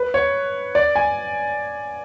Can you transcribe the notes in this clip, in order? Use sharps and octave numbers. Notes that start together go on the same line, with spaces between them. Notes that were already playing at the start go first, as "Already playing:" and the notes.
Already playing: B4
C#5
D5
G#5